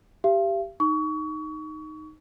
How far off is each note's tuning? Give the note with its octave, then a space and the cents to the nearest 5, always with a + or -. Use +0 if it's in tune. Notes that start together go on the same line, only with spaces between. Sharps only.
G4 +0 F5 -45
D#4 +0 C#6 +30